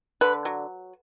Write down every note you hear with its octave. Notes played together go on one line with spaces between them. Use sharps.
D3 B4
F#3